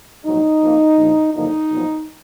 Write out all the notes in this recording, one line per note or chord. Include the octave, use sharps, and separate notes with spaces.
A#1 G#2 F#3 D#4
F2 F3 A#3
A#1 A#2 F3
F#1 F#2 D3 F3 A#3 D#4
B1 A#2 F3 B3